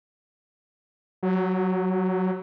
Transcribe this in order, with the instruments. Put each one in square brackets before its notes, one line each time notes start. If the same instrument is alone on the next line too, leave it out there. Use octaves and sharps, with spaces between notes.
[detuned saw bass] F#3